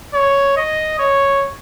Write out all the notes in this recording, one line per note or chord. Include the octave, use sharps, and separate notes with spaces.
C#5
D#5
C#5